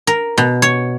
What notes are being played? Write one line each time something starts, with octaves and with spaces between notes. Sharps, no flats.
A#4
B2
C#5